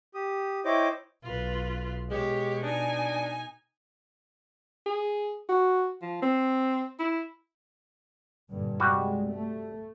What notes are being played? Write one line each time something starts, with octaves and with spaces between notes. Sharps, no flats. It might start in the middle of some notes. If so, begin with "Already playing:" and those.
G4 D#6
E4 C5 C#5 D#5 G5 D6
B1 F4 B4
B2 G#3 G4 C#5
D4 D#4 G#5
G#4
F#4
F3
C4
E4
G2 A#2 D3
C3 G3 G#3 F#4
A3